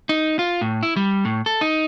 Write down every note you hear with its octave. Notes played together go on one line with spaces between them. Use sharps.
D#4
F4
A2
E4
G3
A2
A4
D#4